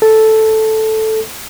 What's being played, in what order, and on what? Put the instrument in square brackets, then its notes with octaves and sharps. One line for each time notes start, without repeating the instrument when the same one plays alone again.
[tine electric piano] A4